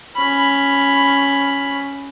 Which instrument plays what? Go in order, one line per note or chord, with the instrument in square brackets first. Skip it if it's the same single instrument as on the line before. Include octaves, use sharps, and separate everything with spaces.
[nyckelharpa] C#4 B5